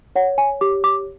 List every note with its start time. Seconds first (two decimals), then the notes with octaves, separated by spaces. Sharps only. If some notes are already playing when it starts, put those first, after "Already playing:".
0.16 C#5 F#5
0.38 G#5
0.61 G4 D6
0.84 D6